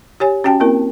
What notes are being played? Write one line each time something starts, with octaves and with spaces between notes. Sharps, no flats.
G4 C#5 G#5
C#4 F#4 G5 A5
A#3 C4 E4 A#4